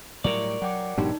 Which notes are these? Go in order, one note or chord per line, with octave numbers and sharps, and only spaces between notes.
A2 F#3 G3 A#4 D5 C#6
F#3 F#5 G5 D6
E1 G#2 B2 F#3 D4 D#4 G4